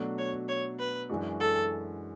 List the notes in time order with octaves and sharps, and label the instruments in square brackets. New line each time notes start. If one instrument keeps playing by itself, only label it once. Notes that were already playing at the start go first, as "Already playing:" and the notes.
Already playing: [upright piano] B2 F#3 A3 D4 F#4
[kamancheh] C#5
C#5
B4
[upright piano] F#2 E3 G#3 D4 F#4
[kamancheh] A4